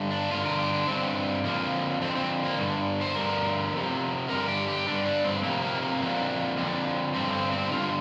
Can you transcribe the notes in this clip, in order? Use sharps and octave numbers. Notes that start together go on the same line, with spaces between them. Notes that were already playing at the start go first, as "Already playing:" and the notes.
Already playing: G2 D3
D4
G2 D3 F4
A#4
G4
D4
G2 D3 C4
F2 D3 A#3
F2 D3 C4
C4
A#3
G2 D3
C5
G2 D3 A#4
F2 C3
G2 D3 A#4
G4
G4
G2 D3 D4
D4
C4
F2 C3 A#3
A#3
A#3
F2 D3
F2 D3
G2 D3 C4
C4
C4
G2 D3 F4